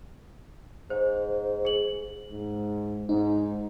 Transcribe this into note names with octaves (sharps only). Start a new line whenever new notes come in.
G#2 C5
G#4 F#7
G#2
G#2 D#4